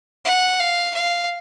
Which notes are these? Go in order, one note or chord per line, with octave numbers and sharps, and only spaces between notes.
F#5
F5
F5